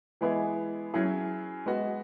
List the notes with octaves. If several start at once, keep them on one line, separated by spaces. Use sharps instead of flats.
E3 G#3 B3 E4 G#4
F#3 C#4 E4 G#4
G#3 B3 F#4